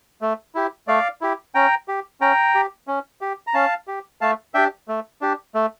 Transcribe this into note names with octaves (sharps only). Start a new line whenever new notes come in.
A3
E4 G4
A3 D5 F5
E4 G4
C#4 G5 A#5
G4
C#4 G5 A#5
G4
C#4
G4
A#5
C#4 F5 A5
G4
A3 F5 A5
D4 G4 E5 G5
A3
D4 G4
A3